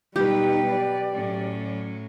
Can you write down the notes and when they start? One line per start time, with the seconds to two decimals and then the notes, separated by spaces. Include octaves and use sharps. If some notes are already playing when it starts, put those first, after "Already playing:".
0.16 B2 F#3 G3 D#4 G4 B4
0.72 D5
1.13 A2 F#3 C#4